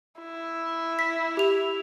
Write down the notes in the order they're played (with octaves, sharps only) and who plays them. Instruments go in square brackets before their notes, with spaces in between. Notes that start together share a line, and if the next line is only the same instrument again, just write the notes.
[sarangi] E4
[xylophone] B6
G4 F7